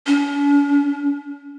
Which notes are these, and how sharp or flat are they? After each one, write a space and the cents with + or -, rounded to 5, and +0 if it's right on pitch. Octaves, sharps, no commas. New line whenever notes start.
C#4 +45